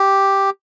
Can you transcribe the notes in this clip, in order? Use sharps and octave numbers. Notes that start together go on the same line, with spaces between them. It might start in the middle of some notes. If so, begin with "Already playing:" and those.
Already playing: G4